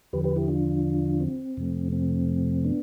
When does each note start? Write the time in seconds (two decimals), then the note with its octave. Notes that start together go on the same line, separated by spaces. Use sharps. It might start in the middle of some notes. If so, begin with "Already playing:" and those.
0.13 E2 D3 F3 G4 B4
0.24 G4 B4
0.36 E4 G4
0.48 D4 F4
1.20 C4
1.57 F2 C3 F3 A3
1.92 C4
2.64 B3 D4